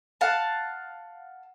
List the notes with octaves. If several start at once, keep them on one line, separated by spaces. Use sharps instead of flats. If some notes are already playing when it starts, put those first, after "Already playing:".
F5 F#5 A5